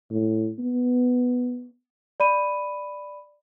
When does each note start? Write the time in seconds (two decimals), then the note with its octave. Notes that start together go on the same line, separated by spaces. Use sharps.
0.11 A2
0.59 B3
2.20 D5 B5 D#7